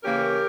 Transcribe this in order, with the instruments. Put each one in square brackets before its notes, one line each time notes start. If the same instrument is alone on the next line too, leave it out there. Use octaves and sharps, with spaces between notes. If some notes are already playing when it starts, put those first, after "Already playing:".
[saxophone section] C#3 E3 A#3 C#4 G4 A#4